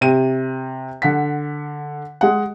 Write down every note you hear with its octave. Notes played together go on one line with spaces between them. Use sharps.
C3 D#7
D3 F#5 B6
G#3 F#5